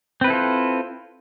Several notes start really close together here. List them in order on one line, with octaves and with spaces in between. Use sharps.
C4 B4 E4 A4 F4